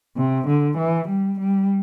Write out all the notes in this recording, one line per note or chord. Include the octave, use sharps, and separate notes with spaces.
C3
D3
E3
G3
G3